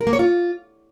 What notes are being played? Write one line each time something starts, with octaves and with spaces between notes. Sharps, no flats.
A#4
A#3
C#5
F4